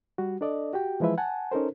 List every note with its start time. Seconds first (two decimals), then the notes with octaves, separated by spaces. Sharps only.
0.18 G3 F#4
0.41 D4 A4 D5 D#5
0.73 F#4 G4 G5
1.00 E3 F3 G#3 E4 B4 E5
1.18 F#5 G#5 A5
1.52 C#4 D#4 A4 A#4 C5